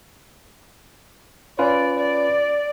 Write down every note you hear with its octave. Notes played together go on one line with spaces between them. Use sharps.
C#4 F4 B4 D5
D5